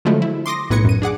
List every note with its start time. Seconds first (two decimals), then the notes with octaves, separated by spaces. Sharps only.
0.05 D3 F3 F#3 G#3 A3 E4
0.22 E4
0.46 C6 D6 D#6 A#6
0.70 B1 A2 B4 G#6 A#6 C#7
0.85 F#2 D#7
1.02 D4 G#4 F#5 D6